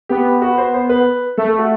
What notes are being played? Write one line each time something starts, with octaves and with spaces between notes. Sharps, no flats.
B3 G4
F#4
C5
C5
B4
A3 A4
A4
F#4